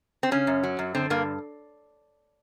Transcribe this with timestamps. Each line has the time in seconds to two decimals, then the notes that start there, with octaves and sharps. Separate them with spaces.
0.23 C4
0.31 C#3 C#4
0.47 F#2
0.63 F#3
0.79 F#2
0.95 D3 C4
1.10 G2 A#3